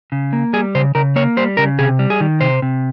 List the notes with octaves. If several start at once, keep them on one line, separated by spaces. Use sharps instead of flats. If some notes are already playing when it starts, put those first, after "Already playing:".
C#3
A#3
G3 G#4
C#3 C5
C#3 A#4
A#3 C#5
G3 C5
C#3 A#4
C3 G#4
G3
G#4
D#3
C3 C5
C3